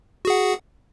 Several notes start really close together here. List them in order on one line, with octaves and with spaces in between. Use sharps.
F#4 G#4 F#5